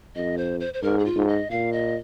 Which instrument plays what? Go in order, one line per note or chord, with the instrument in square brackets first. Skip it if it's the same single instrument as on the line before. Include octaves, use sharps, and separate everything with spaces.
[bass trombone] F2 [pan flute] D#5
[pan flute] C5
C5
C5
[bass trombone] G#2 [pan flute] A#4
[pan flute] G#4
F4
[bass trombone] G#2
[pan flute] D#5
[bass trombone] A#2 [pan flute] F5
[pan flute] D#5